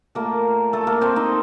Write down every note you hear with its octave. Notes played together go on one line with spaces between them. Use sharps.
A#2 A3 A#3 A#4
A3 A4
A#3 A#4
C4 C5
D#4 D#5